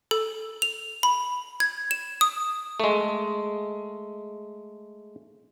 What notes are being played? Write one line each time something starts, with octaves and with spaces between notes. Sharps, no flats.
A4
F7
B5
G#6
E7
D#6
G#3 A3